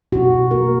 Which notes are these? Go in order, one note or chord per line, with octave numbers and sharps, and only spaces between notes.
B2 F#4
B2
A#3 A#4